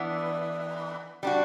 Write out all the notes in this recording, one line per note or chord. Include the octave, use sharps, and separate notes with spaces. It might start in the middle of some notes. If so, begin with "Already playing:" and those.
Already playing: E3 B3 D4
G3 D4 F#4